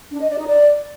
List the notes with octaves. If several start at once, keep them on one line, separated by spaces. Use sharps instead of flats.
D4
D#5
D5
D#4
D5